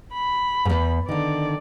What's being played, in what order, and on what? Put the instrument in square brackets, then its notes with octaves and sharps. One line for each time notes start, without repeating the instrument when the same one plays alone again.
[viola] B5
[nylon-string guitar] E2 G#2
[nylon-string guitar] D3 D#3 [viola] D5